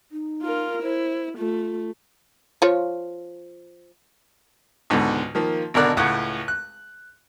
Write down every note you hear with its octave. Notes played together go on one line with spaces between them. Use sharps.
D#4
F4 A#4
E4 C5
A3 F4
F3 F4 C#5
C#2 G#2 B2 D3
D#3 F3 A#3
G#1 B2 D3 A#4 D5 F#6
C#2 A2 C#3 F#5
F#6